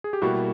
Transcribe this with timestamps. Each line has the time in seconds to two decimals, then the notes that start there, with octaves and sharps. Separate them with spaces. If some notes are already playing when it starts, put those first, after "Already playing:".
0.04 G#4
0.13 G4
0.21 B2 G3 A#3 E4 F#4